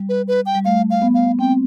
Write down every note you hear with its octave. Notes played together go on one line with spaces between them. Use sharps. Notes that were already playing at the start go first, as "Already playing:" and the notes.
Already playing: G3
B4
B4
G5
G3
A3 F5
F5
B3
F5
C4 G5